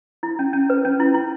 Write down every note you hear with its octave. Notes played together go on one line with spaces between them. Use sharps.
E4
C#4
C#4
B4
C#4
E4
E4